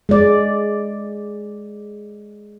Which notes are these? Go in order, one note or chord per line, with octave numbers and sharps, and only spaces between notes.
G#3 D5